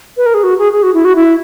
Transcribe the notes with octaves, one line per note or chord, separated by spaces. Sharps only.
B4
A#4
G#4
F#4
G#4
G#4
F#4
E4
F#4
E4